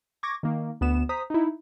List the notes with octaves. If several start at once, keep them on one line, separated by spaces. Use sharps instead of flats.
C#6 D6 G#6 A#6
D#3 A#3
D2 B3 E7
C5 A#5 D#6 B6
D#4 E4